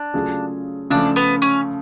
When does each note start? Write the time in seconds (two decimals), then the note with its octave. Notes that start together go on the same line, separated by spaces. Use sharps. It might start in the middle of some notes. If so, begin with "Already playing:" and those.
Already playing: D4
0.14 C#3 F#3 A3 F4 G#4
0.90 C#3 F3 A3 D4
1.16 B3
1.42 C#4